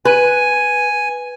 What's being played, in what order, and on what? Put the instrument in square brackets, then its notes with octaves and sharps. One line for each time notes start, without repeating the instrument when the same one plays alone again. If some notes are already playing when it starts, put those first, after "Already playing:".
[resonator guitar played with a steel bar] B4 [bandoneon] G#5